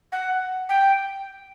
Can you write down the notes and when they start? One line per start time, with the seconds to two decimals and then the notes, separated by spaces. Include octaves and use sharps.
0.12 F#5
0.69 G5